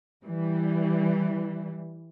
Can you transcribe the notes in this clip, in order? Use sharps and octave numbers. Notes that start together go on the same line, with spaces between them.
E3 G3